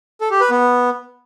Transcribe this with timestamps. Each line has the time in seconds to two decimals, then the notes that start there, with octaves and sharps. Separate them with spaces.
0.21 A4
0.31 G4
0.41 B4
0.50 B3